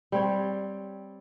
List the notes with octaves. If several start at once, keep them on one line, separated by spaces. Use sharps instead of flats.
G3 C4 C#5